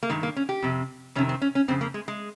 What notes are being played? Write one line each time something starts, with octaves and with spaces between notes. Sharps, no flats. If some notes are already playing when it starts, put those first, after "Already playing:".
A#3
G2 D#3 G#3
A#3
C#4
G4
F2 C3
F2 C3 D#3 C#4
C4
C#4
C#4
F2 C#3 C4
A#3
G#3
G#3